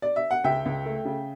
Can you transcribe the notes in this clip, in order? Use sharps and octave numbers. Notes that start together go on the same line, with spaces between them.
D5
E5
F#5
C#2 E5 G5
C#2
A3
C#3